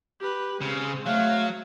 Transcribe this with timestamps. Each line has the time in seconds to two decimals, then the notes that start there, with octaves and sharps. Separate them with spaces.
0.21 G4 B4
0.61 C#3 G#3 C4
1.06 F#3 A3 F5